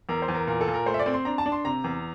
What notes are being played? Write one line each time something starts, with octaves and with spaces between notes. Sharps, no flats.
E2 A#4
C5
E2
A#4
A#2 A#4
A4
A#2
A#4
A3 C5
E5
D5
C4
C6
D4 A#5
A5
D4
C6
C3 A#5
E2